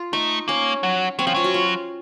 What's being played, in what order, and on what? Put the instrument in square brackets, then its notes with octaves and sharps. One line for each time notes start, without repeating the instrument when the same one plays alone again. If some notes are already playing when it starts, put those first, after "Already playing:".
Already playing: [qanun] F4
[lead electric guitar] A3 [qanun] D#4
[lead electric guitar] A#3 [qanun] C#4
[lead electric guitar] F#3
[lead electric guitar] F#3 [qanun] C4
[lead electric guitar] F3 [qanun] C#4
[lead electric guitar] F#3 [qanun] F4
[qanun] F#4
F4